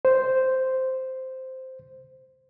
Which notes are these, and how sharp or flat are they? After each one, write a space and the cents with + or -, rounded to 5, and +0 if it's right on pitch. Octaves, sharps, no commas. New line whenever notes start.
C5 -5